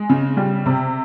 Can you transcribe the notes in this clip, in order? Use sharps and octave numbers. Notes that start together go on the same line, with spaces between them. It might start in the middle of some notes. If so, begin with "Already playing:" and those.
Already playing: G#3
C#3
G3
C3